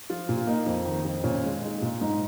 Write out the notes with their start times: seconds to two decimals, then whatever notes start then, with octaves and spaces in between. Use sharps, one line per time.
0.10 F3 F4
0.29 A#2
0.37 F4
0.47 A#3 D#4
0.66 F2
0.85 D#3
1.05 F2
1.24 A#2 C#4
1.44 G#3
1.62 G#3 D#4
1.82 A#2
2.01 G#2 D#4